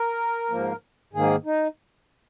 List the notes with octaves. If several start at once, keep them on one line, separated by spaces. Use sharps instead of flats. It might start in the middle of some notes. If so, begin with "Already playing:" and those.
Already playing: A#4
G#2 F3 A#3
G#2 D#3 A#3 G#4
D#4